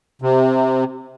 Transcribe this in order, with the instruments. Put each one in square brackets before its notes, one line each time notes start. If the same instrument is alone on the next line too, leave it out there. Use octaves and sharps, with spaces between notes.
[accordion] C3